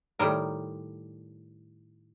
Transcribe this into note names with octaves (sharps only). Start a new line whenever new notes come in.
A2 D#3 G3 A#4